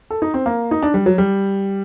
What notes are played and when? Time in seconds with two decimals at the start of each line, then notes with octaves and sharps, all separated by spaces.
0.10 A4
0.22 D#4
0.34 C4
0.46 A#3
0.71 D#4
0.82 D4
0.94 G3
1.06 F#3
1.18 G3